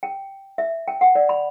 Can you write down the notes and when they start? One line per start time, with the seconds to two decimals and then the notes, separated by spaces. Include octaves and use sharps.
0.03 G5
0.58 E5
0.88 G5
1.01 F#5
1.15 D5
1.29 B5